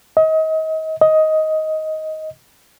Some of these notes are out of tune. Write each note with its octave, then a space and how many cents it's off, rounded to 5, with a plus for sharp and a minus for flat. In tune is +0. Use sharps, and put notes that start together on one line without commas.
D#5 +35
D#5 +15